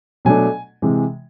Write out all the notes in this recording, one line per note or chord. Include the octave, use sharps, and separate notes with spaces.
B2 F#3 A3 D4 G#5
C3 E3 G#3